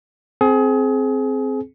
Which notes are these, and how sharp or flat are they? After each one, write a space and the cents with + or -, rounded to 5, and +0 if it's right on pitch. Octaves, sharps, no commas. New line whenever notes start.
C4 +0 G#4 +30